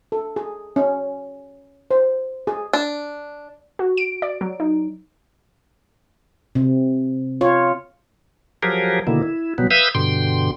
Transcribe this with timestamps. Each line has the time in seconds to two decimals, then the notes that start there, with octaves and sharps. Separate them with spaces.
0.12 A4
0.36 G#4
0.76 C#4
1.91 C5
2.47 G#4
2.73 D4
3.79 F#4
3.97 D7
4.22 D5
4.41 F#3
4.60 D#4
6.55 C3
7.41 F4 C#5
8.63 F3 F#3 G4 G#4 A#4
9.07 B2 D3 D#3 A#3 E4
9.23 E4
9.58 B2 F#3 G3 B3
9.71 B4 E5 F5 D#6 E6 G6
9.95 G2 B2 D3 G5 C6